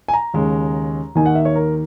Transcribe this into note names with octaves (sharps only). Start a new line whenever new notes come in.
G#5
A#5
D#2 C#3 G#3
D#2 D#3 A#3 D#4 G#5
F#5
E5
C#5
A#4